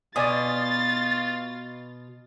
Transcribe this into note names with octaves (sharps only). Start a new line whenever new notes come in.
B2 F4 D5 G#5 D#6 A6